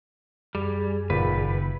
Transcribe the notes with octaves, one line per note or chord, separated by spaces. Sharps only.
F#2 G3 G#4
F#1 A#2 D#3 B4